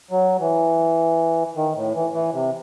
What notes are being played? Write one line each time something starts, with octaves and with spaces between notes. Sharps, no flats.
F#3
E3
D#3
A2
E3
E3
C3